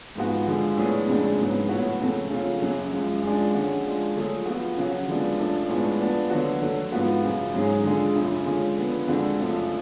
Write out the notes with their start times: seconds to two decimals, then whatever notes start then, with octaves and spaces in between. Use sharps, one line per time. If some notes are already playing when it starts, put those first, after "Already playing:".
0.15 G#2 F3 G#3 B3 F#4
0.47 D3 F3 G#3
0.77 A2 F#3 B3 D4 G#4
1.07 F2 C#3 G#3 D4
1.38 G#2 F#3 B3
1.69 A2 F#3 B3 F#4
2.00 F2 C#3 F#3 A3
2.30 C#3 F#3 A3 F4
2.62 F#2 C#3 F#3
2.93 F#2 F3 G#3
3.23 F#2 F3 G#3 D4
3.54 D3 G#3 C#4 F#4
3.84 F3 G#3 D4
4.15 D3 F#3 A3 F4 G#4
4.45 F3 B3 F#4
4.76 C#3 F#3 C#4 F#4
5.07 D3 F3 G#3 B3 D4
5.38 F#2 F3 A3 D4
5.69 A2 G#3 B3 D4 F4
5.99 F3 B3 D4
6.30 D3 F#3 B3 F#4
6.61 D3 F#3 A3
6.92 G#2 F3 B3 F#4
7.23 F#2 C#3 F3
7.54 G#2 F#3 C#4 G#4
7.83 D3 G#3 D4 F4 G#4
8.15 F#2 C#3 F3
8.45 D3 G#3 C#4 F4
8.76 D3 F3 B3
9.07 F2 D3 G#3 D4 F#4
9.38 F#2 C#3 F3 A3 D4